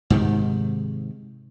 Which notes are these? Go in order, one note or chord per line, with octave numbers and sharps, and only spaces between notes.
G#2 C3 D#3